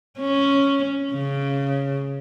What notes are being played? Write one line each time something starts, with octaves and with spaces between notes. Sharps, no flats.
C#4
C#3